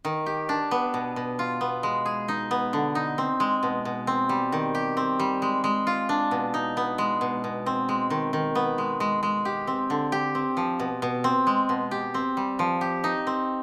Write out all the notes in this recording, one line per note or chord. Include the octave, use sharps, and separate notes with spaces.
D#3
G4
D4
B3
B2
B2
F4
B3
G#3
G#4
D#4
B3
D3
D#4
C4
G#3
B2
B2
C4
G3
D#3
G4
C4
G3
G#3
G#3
F4
D4
B2
D#4
B3
G#3
B2
B2
C4
G#3
D#3
D#3
B3
G#3
G#3
G#3
G4
C4
D3
G4
C4
F3
B2
B2
C4
G#3
B2
G4
C4
G3
F3
G4
D#4
C4